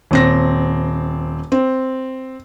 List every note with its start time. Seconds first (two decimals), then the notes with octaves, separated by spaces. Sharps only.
0.11 D#1 C4 A#6
1.52 C4